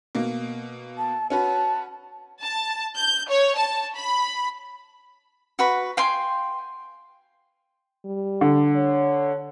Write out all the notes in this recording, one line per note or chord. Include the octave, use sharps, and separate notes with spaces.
B2 A#3
A5
C#4 F#4 B4 A5
A5
G6
C#5
A5
B5
F#4 B4 B5
F5 G5 G#5 C6
G3
D3
C#5